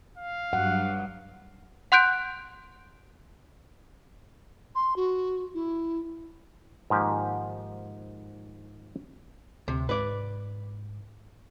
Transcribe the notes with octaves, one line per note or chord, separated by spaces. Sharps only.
F5
G2 F#3 F#5
F#5 C6 F#6 G6 D7
C6
F#4
E4
G#2 D#3 F3 A#3 G4
D2 C3
G#2 B4 D5